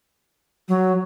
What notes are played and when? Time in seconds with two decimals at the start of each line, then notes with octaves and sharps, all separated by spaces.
0.68 F#3